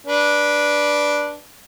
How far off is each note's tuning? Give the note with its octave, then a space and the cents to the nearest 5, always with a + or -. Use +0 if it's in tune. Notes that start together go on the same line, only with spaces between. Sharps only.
D4 +0 B4 -15